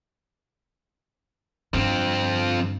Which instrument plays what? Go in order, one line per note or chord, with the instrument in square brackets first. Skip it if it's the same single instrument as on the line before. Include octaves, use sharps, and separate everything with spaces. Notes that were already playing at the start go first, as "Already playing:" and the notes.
[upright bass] G2 D3 [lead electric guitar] F3 C4